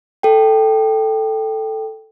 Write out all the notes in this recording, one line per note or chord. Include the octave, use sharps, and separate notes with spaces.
A4 G5